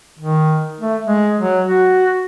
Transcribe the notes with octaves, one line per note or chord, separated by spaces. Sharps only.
D#3
A3
G#3
F#3
F#4